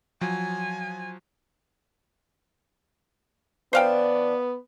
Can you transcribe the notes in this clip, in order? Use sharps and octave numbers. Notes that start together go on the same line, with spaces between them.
F3 F#3 G#5
E3 B3 D4 C5 F5 G5